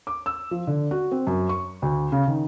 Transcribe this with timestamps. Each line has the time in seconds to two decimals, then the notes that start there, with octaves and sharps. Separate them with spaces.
0.07 D6
0.26 E6
0.51 F3
0.67 D3
0.91 F#4
1.12 C4
1.27 F#2
1.49 C#6
1.82 D2
2.12 C#3
2.27 D#3